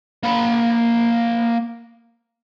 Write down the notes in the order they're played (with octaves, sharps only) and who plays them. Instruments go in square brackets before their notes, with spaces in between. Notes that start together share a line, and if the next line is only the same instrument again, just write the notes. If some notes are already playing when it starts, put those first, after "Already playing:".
[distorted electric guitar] A#3 B5